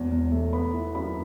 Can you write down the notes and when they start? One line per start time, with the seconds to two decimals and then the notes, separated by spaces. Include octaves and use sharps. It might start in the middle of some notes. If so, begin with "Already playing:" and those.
Already playing: E1 E2
0.11 E2
0.32 A3
0.53 B3 B5
0.73 E4
0.95 F#2 B5